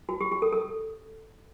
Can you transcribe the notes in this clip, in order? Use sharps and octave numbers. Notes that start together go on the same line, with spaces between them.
F#4
G4
G4
A4
A4